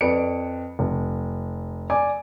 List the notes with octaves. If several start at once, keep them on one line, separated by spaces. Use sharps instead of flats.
F2 B4 D5 C#7 D7
F1
D5 G#5 D6